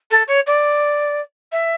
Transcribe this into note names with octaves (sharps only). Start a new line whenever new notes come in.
A4
C#5
D5
E5